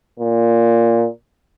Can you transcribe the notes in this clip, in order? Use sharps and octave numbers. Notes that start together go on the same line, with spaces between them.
A#2